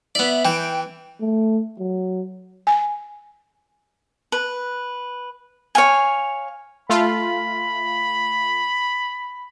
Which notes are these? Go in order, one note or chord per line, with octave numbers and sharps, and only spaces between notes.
B3 D5 E5
E3 G5
A3
F#3
G#5
B4
C#5 F5 G#5
A3 F4 B5